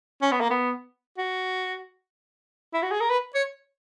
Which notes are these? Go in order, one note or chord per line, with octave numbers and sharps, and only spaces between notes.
C#4
B3
A#3
B3
F#4
E4
F#4
G#4
A#4
B4
C#5